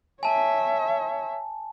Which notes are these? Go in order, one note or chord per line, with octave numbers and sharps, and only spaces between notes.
C#5 E5 G#5 A5